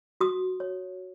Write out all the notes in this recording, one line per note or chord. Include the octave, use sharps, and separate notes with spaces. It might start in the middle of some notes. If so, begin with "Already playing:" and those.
F#4 D#6
C#5